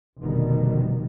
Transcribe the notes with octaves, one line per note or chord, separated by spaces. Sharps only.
F1 B2 D3 D#3 G3